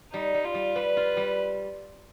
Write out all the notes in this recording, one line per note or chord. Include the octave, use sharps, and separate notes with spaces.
G3 D#4
G3
F4
G3
G3 B4
F4
G3